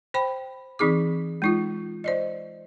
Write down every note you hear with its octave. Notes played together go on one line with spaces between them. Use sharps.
C5 G5 B5
E3 C4 D#4 G#4 D6
G#3 D#4 F4
C5 D5 D#5